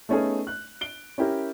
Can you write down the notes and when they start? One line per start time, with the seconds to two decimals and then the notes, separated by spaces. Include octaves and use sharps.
0.09 A3 B3 C#4 D#4 G#4
0.47 F#6
0.81 D7 G7
1.18 C#4 E4 G4 A#4